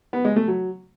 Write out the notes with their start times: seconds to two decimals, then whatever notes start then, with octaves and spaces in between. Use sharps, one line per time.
0.13 B3
0.25 G#3
0.36 A3
0.48 F#3